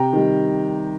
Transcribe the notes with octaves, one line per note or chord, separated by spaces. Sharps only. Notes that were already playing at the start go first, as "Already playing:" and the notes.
Already playing: C3 G5 A#5
D#3 G3